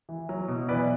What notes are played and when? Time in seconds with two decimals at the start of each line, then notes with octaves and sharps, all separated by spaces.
0.09 E3
0.29 F#3
0.48 B2
0.68 E3 B4 D5